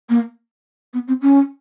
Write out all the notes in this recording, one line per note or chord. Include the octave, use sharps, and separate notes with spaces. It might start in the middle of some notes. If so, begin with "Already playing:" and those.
A#3
B3
C4
C#4